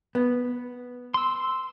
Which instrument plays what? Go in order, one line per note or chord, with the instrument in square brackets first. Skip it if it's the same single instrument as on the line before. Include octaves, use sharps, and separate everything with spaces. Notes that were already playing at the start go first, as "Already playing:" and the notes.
[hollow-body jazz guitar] B3
[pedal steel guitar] C6 E6